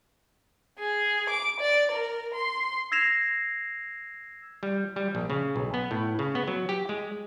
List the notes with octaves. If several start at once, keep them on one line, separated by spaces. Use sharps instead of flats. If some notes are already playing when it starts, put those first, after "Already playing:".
G#4
D6
D5
A#4
C6
E6 G#6 A#6 C7 E7 F7
G3
G3
A#1
C#3
B1
B3
A2
C#3
B3
F#3
G4
G#3